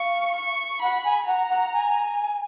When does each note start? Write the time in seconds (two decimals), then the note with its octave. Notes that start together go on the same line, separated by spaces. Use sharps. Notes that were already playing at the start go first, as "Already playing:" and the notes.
Already playing: F5 C#6
0.36 C#6
0.82 F#5 B5
1.05 G#5
1.27 F#5 A#5
1.50 F#5
1.73 G#5